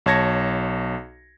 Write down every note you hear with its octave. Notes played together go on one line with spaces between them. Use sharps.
B1 C#5 A5 G#6 A#6 C#7